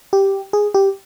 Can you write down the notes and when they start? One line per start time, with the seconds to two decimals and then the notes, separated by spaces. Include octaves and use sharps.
0.13 G4
0.53 G#4
0.74 G4